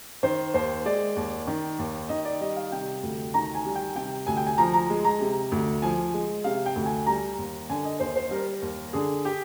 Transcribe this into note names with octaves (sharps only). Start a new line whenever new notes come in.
D#3 C5
D#2 C5
G#3 D5
D#2
D#3
D#2
D#3 D#5
D5
G3 D#5
F5
C3 G5
D2
D#3 A#5
G#5
G3
G5
C3 G5
D2 G#5
G5
G#5
F3 A#5
A#5
G#3
A#5
C3
D2
F3 G#5
G#3
C3 F5
G5
D2
G#5
G3 A#5
D#2
D3 G#5
D#5
D#2 C5
C5
G3 A#4
D#2
D3 G#4
G4